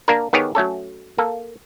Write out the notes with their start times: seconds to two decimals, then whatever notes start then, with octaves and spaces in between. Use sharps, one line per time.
0.08 A#3 D4 A#4
0.33 D#3 B3 G4 G#4 C#5
0.55 F#3 A3 C#4 A4
1.18 A#3 A4